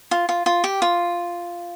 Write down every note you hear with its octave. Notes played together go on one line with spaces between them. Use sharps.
F4
F4
F4
G4
F4